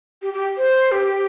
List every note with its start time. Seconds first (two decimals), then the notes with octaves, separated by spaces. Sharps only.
0.22 G4
0.34 G4
0.57 C5
0.92 G4